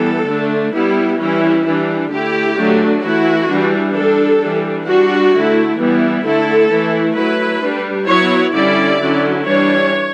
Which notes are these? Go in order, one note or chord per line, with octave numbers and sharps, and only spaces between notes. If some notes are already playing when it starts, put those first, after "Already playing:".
Already playing: E3 G3 B3 A4
D3 A3 D4
G3 B3 E4
E3 G3 C#4 E4
E3 G3 D4
D3 A3 E4 G4
D3 F#3 A3 D4
E3 A3 E4 F#4
E3 G3 D4
G3 D4 A4
E3 G3 D4
G3 D4 F#4
D3 A3 E4
E3 G3 B3 E4
D3 A3 E4 A4
E3 A3 E4
F#3 A3 E4 B4
G3 D4
F#3 B3 E4 C#5
D3 G3 C#4 E4 D5
D3 F#3 C#4 E4
E3 G3 D4 C#5